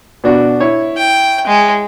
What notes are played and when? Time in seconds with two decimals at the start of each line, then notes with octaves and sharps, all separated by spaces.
0.24 B2 D4 F#4
0.60 E4 C#5
0.97 G5
1.47 G#3